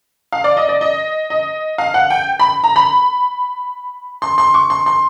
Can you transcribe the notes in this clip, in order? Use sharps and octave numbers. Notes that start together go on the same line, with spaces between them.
F5
D5
D#5
D5
D#5
D#5
F5
F#5
G5
B5
A#5
B5
C6
C6
C#6
C6
C6